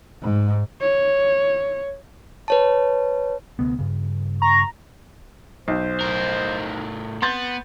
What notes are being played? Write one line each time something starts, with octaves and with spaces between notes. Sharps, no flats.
G#2
C#5
B4 C#5 A5
D2 C3 B3
G2 C#3
A#5 C#6
B1 C5
A2 A#4
B3 C6 G6 A6